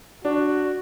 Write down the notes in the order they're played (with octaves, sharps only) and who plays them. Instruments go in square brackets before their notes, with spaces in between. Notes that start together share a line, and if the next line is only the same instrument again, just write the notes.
[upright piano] D4 [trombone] F#4